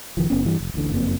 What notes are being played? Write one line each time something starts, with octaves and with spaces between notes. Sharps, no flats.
F1 D#3 F3
F#1 B3 C#4
G2 E3 G3
F1
D1 A1 A2 D3
F#1 F2 A#3 C4